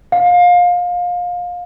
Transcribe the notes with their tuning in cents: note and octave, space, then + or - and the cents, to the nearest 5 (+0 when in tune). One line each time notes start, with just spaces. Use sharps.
F5 +25